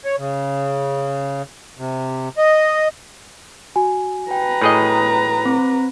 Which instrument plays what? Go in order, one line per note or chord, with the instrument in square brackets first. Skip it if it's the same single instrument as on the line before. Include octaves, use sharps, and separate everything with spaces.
[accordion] C#5
C#3
C3
D#5
[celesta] F#4 G#5
[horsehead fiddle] B4 A#5 [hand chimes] G5
[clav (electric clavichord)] A2 G#4 D#5
[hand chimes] C4 [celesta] D6